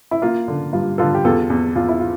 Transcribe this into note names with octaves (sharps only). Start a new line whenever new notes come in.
E4
A#3 F4
D3
G2 F4
D3 F4 A4
G4
E2 F4 A4
E2
E2 F4
E4
F4